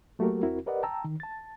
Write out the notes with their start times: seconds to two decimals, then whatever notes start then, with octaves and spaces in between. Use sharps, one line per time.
0.19 F#3 A3 A#3 F#4 G4 A#4
0.43 E2 C4 E4 F#4 A#4
0.66 G4 A#4 B4 D5 D#5 F#5
0.83 G5 A5 A#5 E6
1.04 D#3
1.20 A5 A6